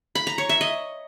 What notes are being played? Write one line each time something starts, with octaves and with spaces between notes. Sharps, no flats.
B5
A#5
C#5
E5
D#5